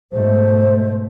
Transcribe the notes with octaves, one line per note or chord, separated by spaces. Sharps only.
G#2 B2 A3 C5